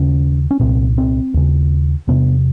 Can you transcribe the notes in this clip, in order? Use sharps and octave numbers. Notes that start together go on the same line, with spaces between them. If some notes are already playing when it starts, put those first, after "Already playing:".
Already playing: D#2 C#3 C#4
C#4
C2 A#2 C4
C4
D#2 C#3
E2 C3 B3